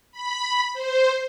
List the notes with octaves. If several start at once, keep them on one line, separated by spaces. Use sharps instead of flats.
B5
C5